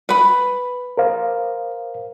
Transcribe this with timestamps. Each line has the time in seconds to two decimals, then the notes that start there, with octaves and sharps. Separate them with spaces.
0.09 B4 B5
0.97 A#4 C5 F5